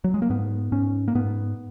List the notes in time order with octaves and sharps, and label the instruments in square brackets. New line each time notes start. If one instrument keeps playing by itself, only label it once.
[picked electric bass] F#3
G#3
A#3
G#2 B3
G#2 C#4
A#3
G#2 B3